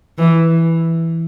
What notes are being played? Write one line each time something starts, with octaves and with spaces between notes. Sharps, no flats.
E3